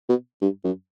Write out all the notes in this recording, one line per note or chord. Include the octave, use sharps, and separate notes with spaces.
B2
G2
F#2